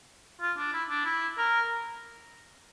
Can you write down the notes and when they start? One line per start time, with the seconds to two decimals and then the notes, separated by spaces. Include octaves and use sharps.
0.41 F4
0.57 D4
0.73 E4
0.90 D4
1.05 E4
1.38 A#4